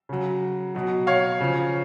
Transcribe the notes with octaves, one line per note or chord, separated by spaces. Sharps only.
C#3 F#3
B2 F#3
C#5 F5
C#3 F3